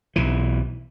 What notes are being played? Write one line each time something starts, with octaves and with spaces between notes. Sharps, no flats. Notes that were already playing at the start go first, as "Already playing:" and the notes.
B1 E3